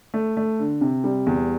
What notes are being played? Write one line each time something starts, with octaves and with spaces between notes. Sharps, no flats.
A3
A3
D3
C3
G3
E2